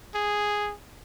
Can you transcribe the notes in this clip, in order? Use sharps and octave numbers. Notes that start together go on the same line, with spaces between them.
G#4